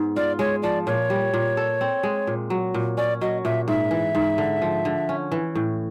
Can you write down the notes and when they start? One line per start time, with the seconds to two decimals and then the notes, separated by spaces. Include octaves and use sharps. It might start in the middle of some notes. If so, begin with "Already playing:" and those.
Already playing: G#2 B3
0.16 F4 D5
0.39 G#3 C#5
0.63 F3 D5
0.87 A#2 C#5
1.10 G3
1.34 A#2
1.57 A4
1.81 C4
2.03 G#3
2.27 A#2
2.50 F#3
2.74 A#2
2.97 C#4 D5
3.21 F#3 D#5
3.45 A#2 E5
3.68 G#2 E5
3.91 E3
4.15 G#2
4.38 D3
4.62 F3
4.85 D3
5.09 C#4
5.32 E3
5.55 A2